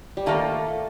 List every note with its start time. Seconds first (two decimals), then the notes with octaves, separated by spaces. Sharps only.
0.17 G3
0.26 D#3 A3 A#3 F4 A4